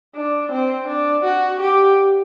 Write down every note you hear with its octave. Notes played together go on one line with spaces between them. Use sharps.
D4
C4
D4
F#4
G4